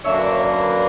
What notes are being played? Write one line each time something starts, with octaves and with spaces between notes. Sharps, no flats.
F#2 D3 A#3 D4 C#5 E5
B4 D5
C#5 E5
B4 D5